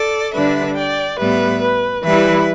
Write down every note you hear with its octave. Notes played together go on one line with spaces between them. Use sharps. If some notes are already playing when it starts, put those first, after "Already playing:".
Already playing: A4 D5
D3 G3 D4 B4 E5
D5 G5
A2 G3 B3 B4 E5
B4
E3 G3 E4 B4 E5